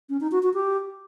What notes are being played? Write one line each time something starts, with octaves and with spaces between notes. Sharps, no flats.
C#4
D#4
F#4
F#4
G4